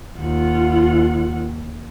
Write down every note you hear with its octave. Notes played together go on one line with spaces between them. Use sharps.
D#2 F4 F#5